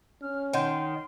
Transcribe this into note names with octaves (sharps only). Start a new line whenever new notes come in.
C#4 F6
D#3 C#5 F#5 C6 G6